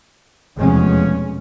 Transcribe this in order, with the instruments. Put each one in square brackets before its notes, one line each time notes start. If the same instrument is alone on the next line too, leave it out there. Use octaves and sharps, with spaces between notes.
[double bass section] F1 E2 B2 F3 G#3 C#4